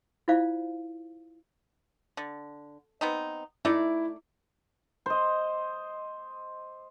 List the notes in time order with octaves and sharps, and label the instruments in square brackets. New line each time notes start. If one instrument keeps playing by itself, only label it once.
[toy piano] E4 F4 C5 D5 F5
[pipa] D3
B3 C4 D#4
[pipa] A3 D#4 D5 [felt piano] E4
[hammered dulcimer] C5 D#5